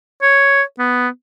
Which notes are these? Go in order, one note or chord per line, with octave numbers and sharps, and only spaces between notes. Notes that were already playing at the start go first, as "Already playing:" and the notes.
C#5
B3